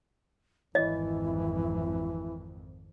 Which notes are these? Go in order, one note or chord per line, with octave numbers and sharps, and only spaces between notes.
G#1 F2 E3 E4 D#5